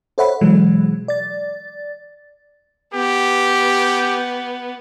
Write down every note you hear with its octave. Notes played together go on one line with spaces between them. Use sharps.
A4 C5 C#5 E5 F#5 B5
B2 E3 F#3 G#3
D5 A6
B3 G4